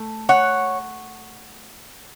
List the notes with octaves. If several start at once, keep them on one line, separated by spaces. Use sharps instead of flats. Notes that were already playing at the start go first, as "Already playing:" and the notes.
Already playing: A3
C#5 F#5